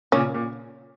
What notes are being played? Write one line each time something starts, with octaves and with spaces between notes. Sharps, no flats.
A#2 C#3 C#4
A#2